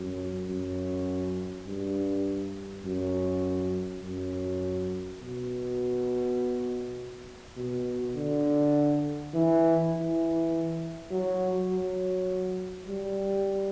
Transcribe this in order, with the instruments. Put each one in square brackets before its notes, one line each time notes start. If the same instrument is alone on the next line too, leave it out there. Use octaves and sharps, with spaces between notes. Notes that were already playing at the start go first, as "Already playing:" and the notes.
Already playing: [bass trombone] F#2
F#2
G2
F#2
F#2
B2
B2
D3
E3
E3
F#3
F#3
G3